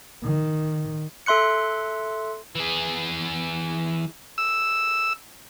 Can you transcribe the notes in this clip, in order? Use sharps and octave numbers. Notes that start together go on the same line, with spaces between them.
D#3
A4 E5 C6 F#6 C#7
E3 G#4
E6